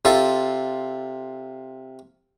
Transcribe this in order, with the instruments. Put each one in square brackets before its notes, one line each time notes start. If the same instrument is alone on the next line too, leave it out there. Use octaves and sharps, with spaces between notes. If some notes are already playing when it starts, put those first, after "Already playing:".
[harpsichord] C3 F4 A4